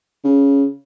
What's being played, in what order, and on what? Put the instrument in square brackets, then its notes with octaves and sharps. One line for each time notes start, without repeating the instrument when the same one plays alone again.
[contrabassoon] C#3